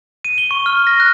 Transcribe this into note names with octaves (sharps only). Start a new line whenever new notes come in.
D#7
G7
C#6
F6
A#6
F#6